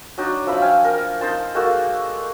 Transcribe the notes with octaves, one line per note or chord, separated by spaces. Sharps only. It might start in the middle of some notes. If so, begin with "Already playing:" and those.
F#3 D4 D#4
F3 E5 B5
F5 G5 G#5
A#4
D#4 C5 A5
G#3 A#3 F#4 A4